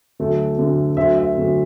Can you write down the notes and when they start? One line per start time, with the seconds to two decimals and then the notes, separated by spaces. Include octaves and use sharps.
0.20 D2 D3 F#3 A3
0.58 D2 D3 F#3 A3
0.97 D2 D3 F#3 E5
1.18 E5
1.35 D2 D3 F#3